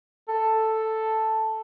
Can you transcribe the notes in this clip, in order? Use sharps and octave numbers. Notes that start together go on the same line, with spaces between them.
A4